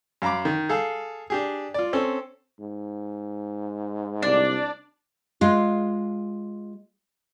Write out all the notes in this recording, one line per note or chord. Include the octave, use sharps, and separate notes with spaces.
F#2 F5 A#5 B5 D6
D#3
G#4 A4 F5
D4 G4 G#4
F4 D5
C4 C#4 A4
G#2
C2 D4 D5
G#3 F4